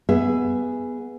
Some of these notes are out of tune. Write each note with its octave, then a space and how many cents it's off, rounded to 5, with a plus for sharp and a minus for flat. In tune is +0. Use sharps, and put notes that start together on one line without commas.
B3 +0 G#4 +0 E5 +20